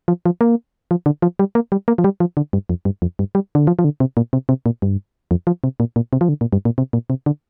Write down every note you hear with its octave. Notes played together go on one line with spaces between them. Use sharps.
F3
F3
A#3
F3
D3
F3
G3
A#3
G3
A#3
F3
G3
F3
D3
G2
F2
G2
F2
G2
G3
D3
F3
F3
D3
C3
A#2
C3
C3
A#2
G2
F2
F3
C3
A#2
A#2
C3
F3
D3
A#2
G2
A#2
C3
A#2
C3
D3